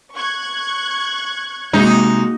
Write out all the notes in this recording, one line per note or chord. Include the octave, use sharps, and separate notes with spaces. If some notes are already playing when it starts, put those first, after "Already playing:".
C#6 F#6 G#6
C3 G#3 A#3 D#4 F#4